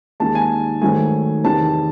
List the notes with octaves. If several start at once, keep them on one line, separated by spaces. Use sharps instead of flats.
D#2 D#3 G#3 A5
G#5
G#2 D#3 F#3 A3 G#5
E2 C3 D#3 A5